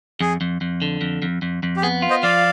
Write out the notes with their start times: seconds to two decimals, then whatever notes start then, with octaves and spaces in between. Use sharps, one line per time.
0.21 F2 G#4
0.41 F2
0.61 F2
0.82 D3
1.01 F2
1.22 F2
1.42 F2
1.63 F2
1.77 G4
1.82 B3 G#4
2.02 F4
2.09 C5 D#5
2.23 F3 D5 F5